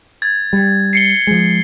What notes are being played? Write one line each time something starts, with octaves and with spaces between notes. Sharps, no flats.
G#6 A6
G3
C7 C#7 G7
F3 G#3